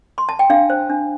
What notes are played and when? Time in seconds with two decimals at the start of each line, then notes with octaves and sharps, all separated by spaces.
0.18 C6
0.29 A5
0.39 G5
0.50 D4 F5
0.70 C5
0.90 D4